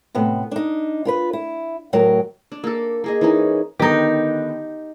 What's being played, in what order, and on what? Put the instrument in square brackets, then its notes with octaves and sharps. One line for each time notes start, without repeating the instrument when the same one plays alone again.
[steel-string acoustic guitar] A2 C3 B3
D4 D#4
F4 A#4 B4
E4
D2 A2 F#3 A#4
[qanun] D4
A#3 A4
A#3 G#4 D#5
E3 C#4 D#4
[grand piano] D3 D#3 B3 [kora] D#4 G4